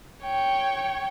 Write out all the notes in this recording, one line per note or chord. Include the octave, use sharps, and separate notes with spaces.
C#5 G5